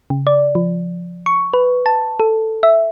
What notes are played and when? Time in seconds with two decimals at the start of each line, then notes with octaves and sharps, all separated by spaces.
0.10 C#3
0.27 D5
0.55 F3
1.26 C#6
1.54 B4
1.86 A5
2.20 A4
2.63 E5